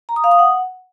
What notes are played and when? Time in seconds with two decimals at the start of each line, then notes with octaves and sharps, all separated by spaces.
0.09 A#5
0.16 D#6
0.24 F5
0.31 D#6
0.39 F#5